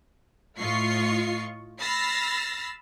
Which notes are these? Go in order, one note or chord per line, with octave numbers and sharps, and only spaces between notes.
A2 F4 D#5 C#6 C7
B5 E6 F6 A6 A#6 C7